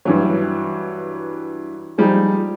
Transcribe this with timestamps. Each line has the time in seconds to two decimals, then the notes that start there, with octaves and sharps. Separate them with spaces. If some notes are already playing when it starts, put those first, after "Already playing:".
0.05 G2 E3 F#3
1.98 F3 G3 G#3 D#4